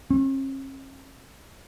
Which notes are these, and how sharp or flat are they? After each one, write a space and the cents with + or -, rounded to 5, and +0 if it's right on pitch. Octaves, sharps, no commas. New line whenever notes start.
C#4 -45